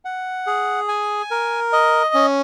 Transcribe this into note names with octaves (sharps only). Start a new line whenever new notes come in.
F#5
G#4
G#5
A#4
D#5
C#4